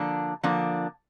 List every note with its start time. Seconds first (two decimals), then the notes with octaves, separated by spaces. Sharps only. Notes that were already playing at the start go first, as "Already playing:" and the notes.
Already playing: D3 F3 A#3 D4
0.43 D3 F3 A#3 D4